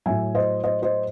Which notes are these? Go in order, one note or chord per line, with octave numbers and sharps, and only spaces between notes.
A2 F#3 E5 G#5
C5 D#5
C5 D#5
C5 D#5